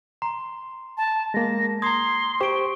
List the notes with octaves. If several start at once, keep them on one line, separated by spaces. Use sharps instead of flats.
A#5 C6
A5
G#3 A#3 A#6
A#5 C6 D#6 G#6 C7
G4 C5 C#6 D7